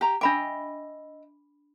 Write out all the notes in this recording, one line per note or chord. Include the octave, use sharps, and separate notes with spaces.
G4 A#5
D4 D#5 E5 G5 B5 D6